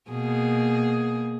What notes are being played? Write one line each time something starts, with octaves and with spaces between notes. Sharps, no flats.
B2 A#3 G#4